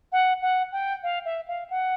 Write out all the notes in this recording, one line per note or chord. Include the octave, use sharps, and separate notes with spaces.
F#5
F#5
G5
F5
E5
F5
F#5